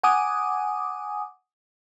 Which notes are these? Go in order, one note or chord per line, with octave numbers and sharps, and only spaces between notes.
F#5 G#5 D6 D#6